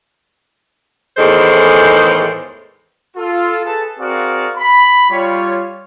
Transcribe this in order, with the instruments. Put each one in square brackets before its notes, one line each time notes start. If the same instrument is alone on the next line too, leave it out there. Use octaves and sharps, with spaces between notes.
[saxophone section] E2 A2 D#3 G#3 A4 C5
[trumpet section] F4 A4
G#4 A4 B4 A5
C4 F#4 G#4 A#4 D5 F5
B5
G3 F4 C#5